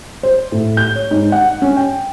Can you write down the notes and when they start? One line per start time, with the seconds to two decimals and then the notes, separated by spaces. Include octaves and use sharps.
0.23 C5
0.52 A2
0.77 G6
0.95 C#5
1.11 G#2
1.32 F#5
1.62 C#4
1.77 G5